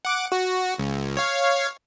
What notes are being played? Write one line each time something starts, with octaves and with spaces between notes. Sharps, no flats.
F#5 D6
F#4
C#2
C#5 F5